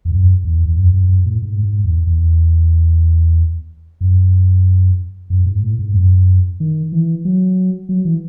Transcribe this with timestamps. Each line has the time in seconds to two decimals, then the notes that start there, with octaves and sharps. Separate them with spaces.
0.05 E2
0.11 F#2
0.44 E2
0.65 E2
0.76 F#2
0.94 F#2
1.09 F#2
1.26 A2
1.42 G#2
1.62 G#2
1.84 E2
2.07 E2
4.01 F#2
5.30 F#2
5.46 G#2
5.63 A2
5.79 G#2
5.94 F#2
6.60 D#3
6.92 E3
7.25 F#3
7.89 F#3
8.05 E3